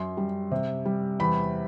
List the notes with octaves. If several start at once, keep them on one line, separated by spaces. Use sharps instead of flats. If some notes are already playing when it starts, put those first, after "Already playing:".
Already playing: F#2 C6
G3
C3
G3
E2 B5